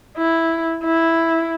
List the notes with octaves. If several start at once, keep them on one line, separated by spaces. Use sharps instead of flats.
E4
E4